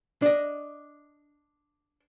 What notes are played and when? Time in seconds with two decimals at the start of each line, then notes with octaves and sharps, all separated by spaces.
0.22 D4 D#5